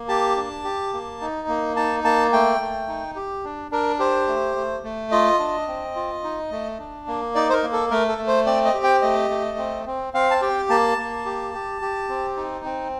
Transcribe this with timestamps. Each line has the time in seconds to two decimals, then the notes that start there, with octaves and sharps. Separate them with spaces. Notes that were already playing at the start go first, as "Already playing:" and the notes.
Already playing: A#3
0.09 G4 A5
0.36 D4
0.64 G4
0.93 A#3
1.21 D#4
1.48 A#3
1.76 D#4 A5
2.04 A#3 A5
2.33 A3 G5
2.61 A3
2.88 D#4
3.16 G4
3.45 D4
3.71 D4 A#4
3.99 G4 C5
4.28 A3
4.56 A3
4.84 A3
5.11 F4 D#5
5.39 D4
5.68 C4
5.96 F4
6.24 D#4
6.51 A3
6.79 D4
7.07 A#3
7.35 D#4 D5
7.49 C5
7.53 A#4
7.63 A#3
7.72 A4
7.90 A3 A#4
8.09 A4
8.18 A3
8.27 C5
8.46 C4 D5
8.65 D#5
8.74 G4
8.84 G5
9.02 A3 D#5
9.30 A3
9.58 C4
9.87 C4
10.14 C4 F5
10.31 A5
10.42 G4 G5
10.69 A#3 A5
10.98 A#3
11.25 G4
11.54 G4
11.82 G4
12.09 C4
12.37 D#4
12.65 C4